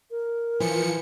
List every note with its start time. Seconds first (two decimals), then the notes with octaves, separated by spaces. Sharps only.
0.11 A#4
0.60 E3 F3 C#7